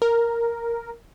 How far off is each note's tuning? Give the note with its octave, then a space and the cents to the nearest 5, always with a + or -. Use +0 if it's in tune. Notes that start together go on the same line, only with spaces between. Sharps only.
A#4 +0